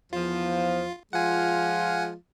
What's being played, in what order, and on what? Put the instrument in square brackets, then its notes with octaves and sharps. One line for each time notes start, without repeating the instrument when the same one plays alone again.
[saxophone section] E2 F3 [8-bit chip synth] F4
[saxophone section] F3 G#3 F4 [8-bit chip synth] F#5 G#5